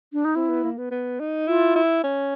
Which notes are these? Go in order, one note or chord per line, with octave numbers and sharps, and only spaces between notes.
D4
D#4
C4 E4
B3
A#3
B3
B3
D#4
E4 F4
E4
C#4